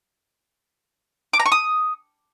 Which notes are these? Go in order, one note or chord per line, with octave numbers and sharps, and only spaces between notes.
D6
A#5
C#6
D#6